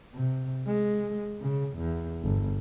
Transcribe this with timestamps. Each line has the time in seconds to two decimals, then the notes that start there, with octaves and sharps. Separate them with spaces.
0.14 C3
0.67 G#3
1.41 C#3
1.77 E2
2.23 G1